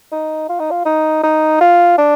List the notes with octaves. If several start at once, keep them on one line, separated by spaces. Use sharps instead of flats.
D#4
F4
D#4
F4
D#4
D#4
F4
D4